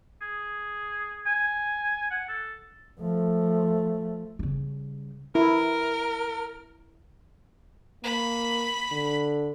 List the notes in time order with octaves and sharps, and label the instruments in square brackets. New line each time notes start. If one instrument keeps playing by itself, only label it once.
[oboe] G#4
G#5
F#5
A4
[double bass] F3 A3
[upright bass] C#3 G3
[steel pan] E4 [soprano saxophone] A#4
[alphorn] A#3 [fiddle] B5
[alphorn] D3